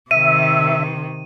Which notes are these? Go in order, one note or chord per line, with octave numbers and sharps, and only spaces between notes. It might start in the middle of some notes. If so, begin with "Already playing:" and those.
C3 D#3 E5 D#7